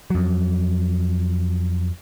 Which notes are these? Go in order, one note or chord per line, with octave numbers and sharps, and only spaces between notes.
F2 F#3